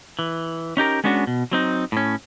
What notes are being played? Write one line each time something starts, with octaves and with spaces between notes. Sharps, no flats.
E3
C#4 D#4 G4 A#4
G#3 B3 C#4 D4 F#4
B2
F#3 C4 D#4
A2 C#4